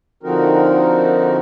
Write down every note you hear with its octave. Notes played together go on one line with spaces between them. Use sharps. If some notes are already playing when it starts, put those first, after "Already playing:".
D3 F3 C4 D#4 F#4 A#4